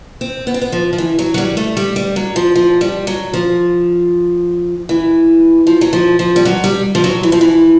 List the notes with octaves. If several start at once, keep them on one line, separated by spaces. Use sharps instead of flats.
C4
B3
C4
B3
F3
F3
E3
F#3
F#3
G3
A3
G3
G3
F#3
F3
F3
G3
F#3
F3
E3
F3
F#3
F3
F3
G3
F#3
G3
F3
F#3
E3
F3
E3